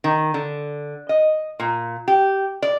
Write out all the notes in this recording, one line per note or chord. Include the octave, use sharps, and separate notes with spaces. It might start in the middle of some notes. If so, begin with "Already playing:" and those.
D#3
D3
D#5
A#2
G4
D5